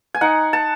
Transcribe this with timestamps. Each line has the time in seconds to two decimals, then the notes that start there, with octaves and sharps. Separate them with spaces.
0.15 G#5
0.21 D#4 F#5
0.53 A5